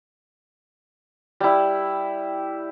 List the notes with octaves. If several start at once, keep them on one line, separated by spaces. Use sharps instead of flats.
G3 E4